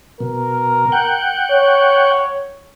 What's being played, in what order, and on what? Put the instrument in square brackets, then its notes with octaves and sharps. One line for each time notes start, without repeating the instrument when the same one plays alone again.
[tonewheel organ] B2 [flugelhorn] A#4
[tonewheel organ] F#5 G5
[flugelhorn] C#5